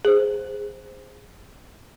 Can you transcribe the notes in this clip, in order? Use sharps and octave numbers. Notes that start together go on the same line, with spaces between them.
G#4 C5